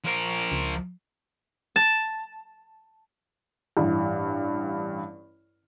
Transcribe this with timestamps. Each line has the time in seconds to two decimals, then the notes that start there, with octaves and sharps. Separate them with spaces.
0.04 F3 A#4
0.52 C#2
1.76 A5
3.77 A1 G2